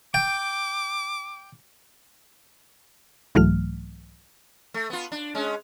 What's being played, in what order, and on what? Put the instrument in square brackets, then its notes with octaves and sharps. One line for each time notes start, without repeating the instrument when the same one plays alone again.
[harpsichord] G5 [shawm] D6
[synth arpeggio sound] C2 G#2 E3 F#3 A3 F6
[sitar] A3
B3 F4
D4
G#3 C#4